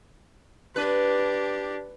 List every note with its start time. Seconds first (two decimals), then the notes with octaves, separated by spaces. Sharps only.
0.76 D4 G4 B4